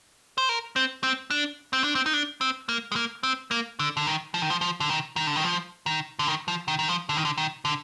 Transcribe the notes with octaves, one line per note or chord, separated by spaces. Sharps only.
C5
A#4
C4
C4
D4
C4
D4
C4
D#4
D4
C4
A#3
G#3
A#3
C4
A#3
D3
D3
D#3
F3
D#3
F3
F3
D3
D#3
D#3
D3
D#3
F3
D#3
D3
D#3
F3
D#3
D#3
F3
D3
D#3
D3
D#3
D3